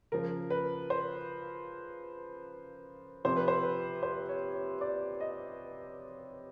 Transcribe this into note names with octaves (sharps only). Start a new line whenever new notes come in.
C#3 F3 A#4
B4
C5
C3 F3 C5
B4
C5
B4
C5
C#5
C#5
D5
D#5